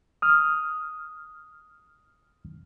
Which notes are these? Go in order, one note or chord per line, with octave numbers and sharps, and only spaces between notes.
D#6 F6